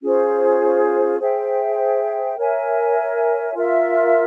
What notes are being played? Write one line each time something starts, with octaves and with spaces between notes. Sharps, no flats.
C#4 F4 G#4 C5
G#4 C5 E5 G5
A#4 C#5 E5 G#5
F4 A#4 E5